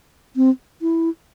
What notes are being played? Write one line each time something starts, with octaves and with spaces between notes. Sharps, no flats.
C4
E4